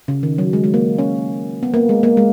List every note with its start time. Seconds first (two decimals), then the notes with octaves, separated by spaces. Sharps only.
0.08 C#3
0.23 D#3
0.38 F#3
0.53 G#3
0.64 G#3
0.74 A#3
0.98 C#4
1.63 B3
1.74 A#3
1.89 G#3
2.03 A#3
2.17 G#3